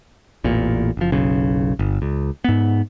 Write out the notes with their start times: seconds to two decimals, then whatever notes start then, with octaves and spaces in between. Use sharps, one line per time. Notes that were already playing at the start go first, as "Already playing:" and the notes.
0.44 A1 E2 A#2
0.97 F#1 F3
1.12 F#1 B1 C#3
1.79 G1
2.02 C#2
2.44 G#2 B3